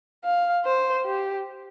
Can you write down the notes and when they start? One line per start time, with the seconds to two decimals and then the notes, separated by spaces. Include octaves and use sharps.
0.24 F5
0.65 C5
1.05 G4